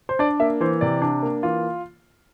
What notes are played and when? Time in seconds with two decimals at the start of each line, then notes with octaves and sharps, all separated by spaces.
0.09 C5
0.19 D4 D5
0.40 A#3 E5
0.61 E3 C5
0.81 C3 D5
1.02 D4
1.23 A#3
1.43 E3 F4